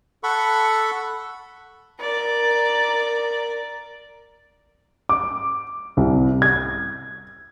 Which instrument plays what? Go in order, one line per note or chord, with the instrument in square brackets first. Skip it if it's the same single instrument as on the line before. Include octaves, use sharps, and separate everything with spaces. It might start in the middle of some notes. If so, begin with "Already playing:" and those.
[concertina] A4 F#5 B5 C#6
[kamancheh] A#4 D5
[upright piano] D6
C2
G#6